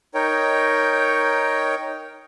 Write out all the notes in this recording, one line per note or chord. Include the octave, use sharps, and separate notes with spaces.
D#4 A#4 C#5 G5